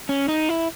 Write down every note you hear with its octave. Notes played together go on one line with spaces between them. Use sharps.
C#4
D#4
E4